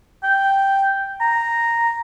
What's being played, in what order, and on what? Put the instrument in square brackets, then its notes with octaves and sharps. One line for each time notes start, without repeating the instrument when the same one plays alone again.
[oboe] G5
A#5